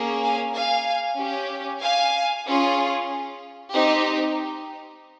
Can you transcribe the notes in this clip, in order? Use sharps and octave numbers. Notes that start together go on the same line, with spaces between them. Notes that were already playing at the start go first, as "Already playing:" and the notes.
Already playing: A#3 C#4 G#4
F5 G#5
F5 G#5
C#4 G4
F5 G#5
C#4 F4 G#4
C4 D#4 G4